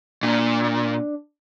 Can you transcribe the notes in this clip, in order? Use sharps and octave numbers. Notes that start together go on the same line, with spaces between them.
A#2 D4